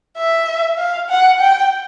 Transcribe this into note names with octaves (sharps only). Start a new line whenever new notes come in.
E5
F5
F#5
G5